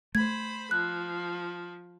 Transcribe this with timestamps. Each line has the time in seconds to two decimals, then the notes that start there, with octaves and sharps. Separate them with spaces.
0.15 A3 C5 B5 G#6
0.71 F3 F#6